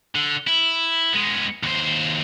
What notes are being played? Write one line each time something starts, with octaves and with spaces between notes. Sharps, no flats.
D3
E4
G#3 B3
D#2 C5